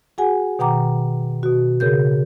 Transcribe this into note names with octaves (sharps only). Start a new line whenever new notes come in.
F#4 G#4 F#5 G#5
B2 D#3 F#5 G5 A#5 D6
B2 F#4
C#3 G#4 A#4 G6